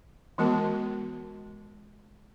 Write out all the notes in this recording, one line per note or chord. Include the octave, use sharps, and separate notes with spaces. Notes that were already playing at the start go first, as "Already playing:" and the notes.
E3 G#3 B3 F#4 A#4 A5